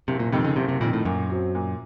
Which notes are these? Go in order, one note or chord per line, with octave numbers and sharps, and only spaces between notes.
F#1 C3
A#2
F2 C3 D#3
C#3
F#1 C3
C3
F2 A#2 D#3
A2
F#2 A#2
F#3 C4
A#2